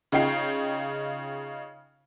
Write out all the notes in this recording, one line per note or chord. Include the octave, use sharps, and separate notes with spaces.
C#3 D#4 F4 G5 C7